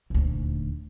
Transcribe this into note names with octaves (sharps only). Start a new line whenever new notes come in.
D#1 D2